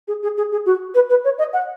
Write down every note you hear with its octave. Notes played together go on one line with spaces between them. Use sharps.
G#4
G#4
G#4
G#4
F#4
B4
B4
C#5
D#5
F#5